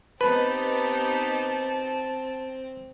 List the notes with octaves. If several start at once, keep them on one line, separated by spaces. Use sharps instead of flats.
B3 C4 D#4 G4 B4 A5